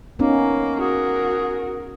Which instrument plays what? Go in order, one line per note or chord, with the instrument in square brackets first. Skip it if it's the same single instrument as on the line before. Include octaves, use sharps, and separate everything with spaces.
[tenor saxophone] A#3 [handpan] B3 C#4 D#4
[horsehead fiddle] F#4 A#4 [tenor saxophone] G#4